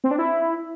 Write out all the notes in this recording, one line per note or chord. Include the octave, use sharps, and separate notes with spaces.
C4
D4
E4